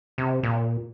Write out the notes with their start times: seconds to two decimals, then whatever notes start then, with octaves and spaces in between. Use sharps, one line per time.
0.18 C3
0.43 A#2